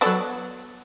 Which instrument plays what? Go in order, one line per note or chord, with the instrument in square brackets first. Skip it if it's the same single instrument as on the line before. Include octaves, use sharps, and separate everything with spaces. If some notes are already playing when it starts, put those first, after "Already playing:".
[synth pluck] F#3 A4 D5 [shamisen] B3 A5